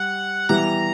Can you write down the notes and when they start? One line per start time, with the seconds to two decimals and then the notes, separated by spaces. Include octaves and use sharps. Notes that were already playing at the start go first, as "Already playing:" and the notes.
Already playing: G3 F#5
0.49 E3 G3 B3 A#5